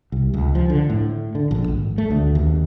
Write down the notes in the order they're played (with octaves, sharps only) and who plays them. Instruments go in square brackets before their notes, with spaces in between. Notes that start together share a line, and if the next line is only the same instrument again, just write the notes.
[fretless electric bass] C2
C#2
F3
D3
A2
D3
A#1
G#1
A3
D2
D#2